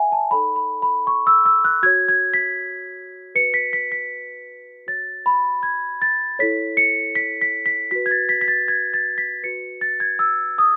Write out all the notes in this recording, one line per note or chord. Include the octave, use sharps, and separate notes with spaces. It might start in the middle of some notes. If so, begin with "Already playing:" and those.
Already playing: E5 F#5 G#5
A5
D#4 A4 C#5 B5
B5
B5
C#6
E6
E6
F#6
F#4 C#5 G#6
G#6
B6
F#4 B4 C#7
B6
B6
B6
F#4 C#5 A6
B5
G#6
A6
E4 A4 C#5 B6
C#7
B6
B6
B6
F#4 B4 B6
G#6
A6
B6
B6
A6
G#6
A6
B6
F#4 B4 C#7
A6
G#6
E6
D#6